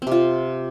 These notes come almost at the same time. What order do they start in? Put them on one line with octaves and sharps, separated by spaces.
C4 C3 F4